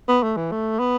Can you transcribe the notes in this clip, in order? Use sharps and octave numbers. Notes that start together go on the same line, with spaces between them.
B3
A3
E3
A3
B3